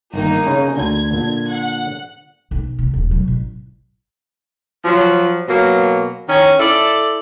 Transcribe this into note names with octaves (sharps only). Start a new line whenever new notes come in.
G1 D#3 A#3 D#4
C#3 C#4 E4
D2 D3 G#6
A#2 D3
F#5
B1
C3
D#1
B2 F#3
A1
F3 F#3
B2 F#3 A#3
D#3 C#4
E4 A4 D5